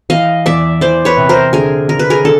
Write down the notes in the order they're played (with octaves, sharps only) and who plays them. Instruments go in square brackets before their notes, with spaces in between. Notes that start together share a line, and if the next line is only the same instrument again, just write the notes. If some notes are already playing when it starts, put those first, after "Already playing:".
[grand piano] E3 [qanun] D#5 F5
[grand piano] E2 [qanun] D5 E5
[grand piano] E3 [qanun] C5 D5
[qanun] B4 C#5
[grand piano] C3
[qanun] A#4 C5
[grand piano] D3 [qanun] G#4 A#4
[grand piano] D3 [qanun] A#4
[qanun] B4
G#4 A#4
[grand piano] D3 [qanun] A4